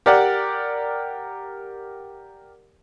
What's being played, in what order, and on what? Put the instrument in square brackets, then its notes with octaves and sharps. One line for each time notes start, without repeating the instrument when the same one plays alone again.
[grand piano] G4 A#4 D5 F#5